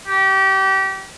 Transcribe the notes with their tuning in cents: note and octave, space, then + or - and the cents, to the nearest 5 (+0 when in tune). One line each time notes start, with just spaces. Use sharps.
G4 -30